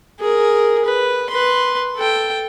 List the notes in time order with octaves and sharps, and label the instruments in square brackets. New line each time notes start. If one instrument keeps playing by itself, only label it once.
[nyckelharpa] G#4 A#4
B4
B4 C6
A4 G5